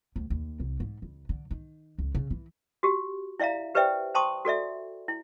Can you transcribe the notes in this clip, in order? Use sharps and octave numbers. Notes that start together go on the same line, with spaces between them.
D2
D#2
C2
G#2
C#2
D3
D#3
C#2
C#3
E3
F#4 G4
E4 D5 E5 F5 A#5
G4 B4 C5 D5 E5 G5
C5 G5 A5 C6 C#6 D#6
F#4 A4 D5 E5
E4